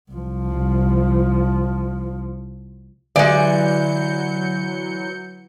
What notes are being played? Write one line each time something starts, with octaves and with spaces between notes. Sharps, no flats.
C2 F3
D3 E3 F#3 G#3 D5 G6 C#7